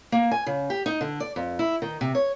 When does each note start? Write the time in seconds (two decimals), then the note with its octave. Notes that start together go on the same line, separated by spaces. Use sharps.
0.12 A#3
0.31 G#5
0.46 C#3
0.70 G4
0.86 D#4
1.01 D3
1.20 D5
1.36 F2
1.59 E4
1.82 D#3
2.01 C3
2.15 C#5